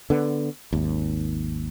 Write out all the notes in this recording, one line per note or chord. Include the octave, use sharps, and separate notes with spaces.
D3 B3
G#1 D#2